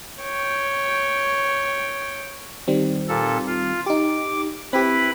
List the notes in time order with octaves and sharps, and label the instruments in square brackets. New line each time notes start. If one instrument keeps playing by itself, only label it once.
[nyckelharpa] C#5 G5
[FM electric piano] D#3 G3 C4
[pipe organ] A#2 A4
F4
[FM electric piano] D#4 G4 [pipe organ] D6
[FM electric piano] C4 G4 [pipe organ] E4 B4 B5